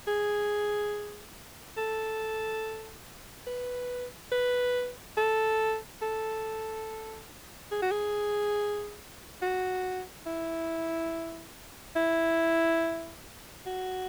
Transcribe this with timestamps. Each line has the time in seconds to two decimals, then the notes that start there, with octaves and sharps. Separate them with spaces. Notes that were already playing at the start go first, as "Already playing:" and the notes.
0.07 G#4
1.77 A4
3.47 B4
4.32 B4
5.17 A4
6.02 A4
7.72 G#4
7.82 F#4
7.91 G#4
9.42 F#4
10.26 E4
11.96 E4
13.66 F#4